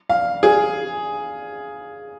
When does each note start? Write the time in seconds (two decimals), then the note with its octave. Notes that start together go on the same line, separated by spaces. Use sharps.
0.09 F5
0.43 G#4